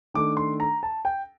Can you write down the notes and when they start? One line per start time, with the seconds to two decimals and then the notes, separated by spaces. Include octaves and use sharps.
0.14 D#3 A3 D4 D6
0.37 C6
0.60 A#5
0.83 A5
1.05 G5